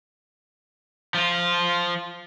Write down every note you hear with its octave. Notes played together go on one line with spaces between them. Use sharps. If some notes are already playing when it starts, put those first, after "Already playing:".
F3 F4